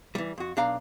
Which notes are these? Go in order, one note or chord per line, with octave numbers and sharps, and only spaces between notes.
E3 G3
F2 F#4
B1 D4 F5 A#5